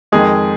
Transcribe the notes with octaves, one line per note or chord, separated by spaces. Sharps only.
F2 D#3 G#3 D#4 G#4